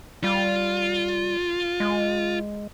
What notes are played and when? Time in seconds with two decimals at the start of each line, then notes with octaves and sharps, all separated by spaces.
0.24 G3 F4
1.80 G#3